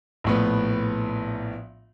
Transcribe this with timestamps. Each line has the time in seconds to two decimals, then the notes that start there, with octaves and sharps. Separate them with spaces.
0.24 A#1 A2 B3